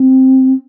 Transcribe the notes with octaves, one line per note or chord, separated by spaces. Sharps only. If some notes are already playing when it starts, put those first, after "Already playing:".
Already playing: C4